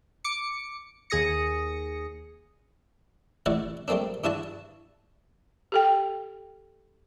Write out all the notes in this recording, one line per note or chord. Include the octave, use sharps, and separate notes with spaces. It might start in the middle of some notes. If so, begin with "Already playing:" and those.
D6 C#7
D#2 G#4 D#6 A#6 C#7
A1 E4 D5 F#5 C#6
G3 A3 A#3 C4 D4
G2 D4 E4 F#4 A5
G4 A4 G5